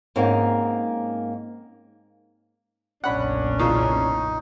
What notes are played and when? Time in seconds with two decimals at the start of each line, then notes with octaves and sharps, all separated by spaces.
0.16 G#2 A#3 C4 C#4 D#4
3.04 F#1 B1 A#2 C#4 D4 F#5 B5
3.59 C#3 E3 D#4 F4